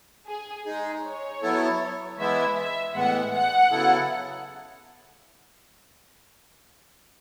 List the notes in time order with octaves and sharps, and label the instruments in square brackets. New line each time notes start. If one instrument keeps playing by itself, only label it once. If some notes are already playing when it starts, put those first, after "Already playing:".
[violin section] G#4
[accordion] G#3 D#4 G#4
[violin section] C#5
[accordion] F#3 B3 E4 A4
[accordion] E3 G#3 B3 E4 [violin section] E5
[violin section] E5
[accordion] A2 E3 G#3 B3 [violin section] F#5
[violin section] F#5
[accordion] C#3 F#3 B3 E4 A4